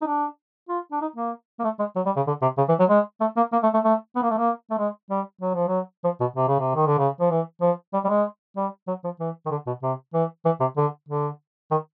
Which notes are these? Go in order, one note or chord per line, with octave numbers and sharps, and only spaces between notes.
D#4
D4
F4
D4
D#4
A#3
A#3
A3
G#3
F#3
G3
C#3
D3
C3
C#3
E3
F#3
G#3
A3
A#3
A#3
A3
A3
A3
B3
A#3
A3
A#3
A3
G#3
G3
F#3
F3
F#3
F3
B2
C3
C#3
C3
D#3
D3
C#3
F3
E3
F3
G3
G3
G#3
G3
F#3
F3
E3
D#3
D3
B2
C3
E3
E3
C3
D3
D3
D#3